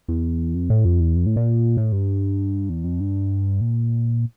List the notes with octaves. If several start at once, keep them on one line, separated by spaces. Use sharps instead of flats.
E2
F2
A2
F2
E2
F2
A2
A#2
A2
G2
E2
F2
G2
A#2